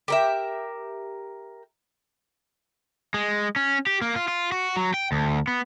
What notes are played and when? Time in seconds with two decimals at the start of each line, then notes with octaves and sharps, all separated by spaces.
0.08 G4 A#4 E5
3.14 G#3
3.56 C#4
3.87 G4
4.02 A#3
4.16 F4
4.28 F4
4.52 F#4
4.77 F#3
4.94 G5
5.12 D2
5.48 B3